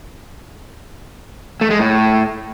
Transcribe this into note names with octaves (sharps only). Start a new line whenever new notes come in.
A3
G#3
A2